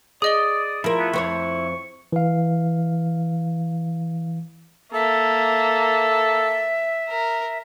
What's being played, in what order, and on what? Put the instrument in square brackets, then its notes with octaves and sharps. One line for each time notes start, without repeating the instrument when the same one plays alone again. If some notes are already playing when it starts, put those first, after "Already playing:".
[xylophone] G#4 D#5 G7 [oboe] D5 [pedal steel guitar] D#6
[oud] F3 A#4 [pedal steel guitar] E4
[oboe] B3
[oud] F2 C5 C#5 [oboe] C#6
[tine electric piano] E3 F5
[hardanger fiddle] A#3 [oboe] A4 [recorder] E5
[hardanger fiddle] A#4